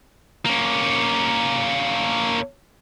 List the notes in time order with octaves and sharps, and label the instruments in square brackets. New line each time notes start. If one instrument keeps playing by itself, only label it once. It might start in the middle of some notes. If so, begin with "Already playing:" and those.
[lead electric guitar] A#3 C#4